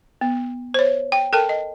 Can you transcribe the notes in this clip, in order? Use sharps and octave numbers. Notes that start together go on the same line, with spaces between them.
B3
C5 C#5
G5
A4 A#4 G5 A5
D#5